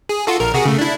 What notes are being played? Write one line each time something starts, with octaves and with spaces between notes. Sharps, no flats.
G#4
F4 F#4 A4
A#1 A#4
C3 F#4 G#4
C#3 A3
D4 E4